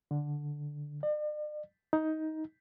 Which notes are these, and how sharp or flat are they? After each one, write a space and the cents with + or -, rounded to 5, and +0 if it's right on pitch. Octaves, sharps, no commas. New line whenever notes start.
D3 +0
D5 +45
D#4 +15